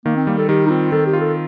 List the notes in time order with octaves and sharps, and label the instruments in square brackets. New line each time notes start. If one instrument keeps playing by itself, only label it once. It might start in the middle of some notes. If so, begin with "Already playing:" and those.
[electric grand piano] D#3 [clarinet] A#3
[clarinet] C4
[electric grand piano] G3 [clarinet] A#3
[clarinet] A4
[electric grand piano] D#3 [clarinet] G4
[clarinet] D#4
[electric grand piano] C4 [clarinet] F4
[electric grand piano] D#3 [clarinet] A4
[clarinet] G4
[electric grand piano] F4
[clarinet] A4